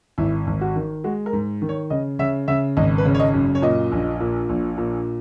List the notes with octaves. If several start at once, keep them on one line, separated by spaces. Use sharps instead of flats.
G#1 E4
G#1
F#4
D#3
G#3 F#4
A#4
G#2
D#3
C#5
C#3 D#5
C#3 E5
C#3 E5
G#1 D#5
B4
C#3
C#5
D#5
F#2
C#5
A#2 D#5
A#1
A#2
A#1
A#2